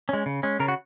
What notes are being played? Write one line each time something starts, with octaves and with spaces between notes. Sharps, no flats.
G#3 C#4
C#3
G#3 C#4
C#3 A#4
F#4